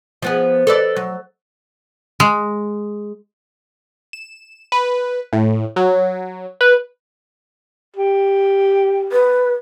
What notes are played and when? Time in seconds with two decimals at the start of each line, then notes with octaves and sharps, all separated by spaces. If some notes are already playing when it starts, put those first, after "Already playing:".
0.22 F3 B3 G#4
0.67 A4 B4 D5
0.96 F#3
2.20 G#3
4.13 E7
4.72 B4
5.33 A2
5.76 F#3
6.61 B4
7.96 G4
9.12 B4